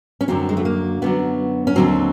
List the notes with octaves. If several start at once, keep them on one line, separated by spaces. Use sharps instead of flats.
C#4
F#2 D3 F#3 C4
G#3
A3
A#3
F#2 D3 F#3 B3
C#4
D#2 D3 F#3 C4